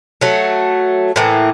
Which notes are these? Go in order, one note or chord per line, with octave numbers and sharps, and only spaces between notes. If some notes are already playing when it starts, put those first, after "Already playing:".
F#3 A3
A2 E3 A#3